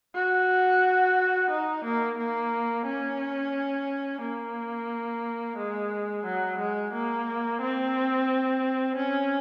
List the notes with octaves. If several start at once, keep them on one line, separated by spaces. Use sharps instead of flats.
F#4
D#4
A#3
A#3
C#4
A#3
G#3
F#3
G#3
A#3
C4
C#4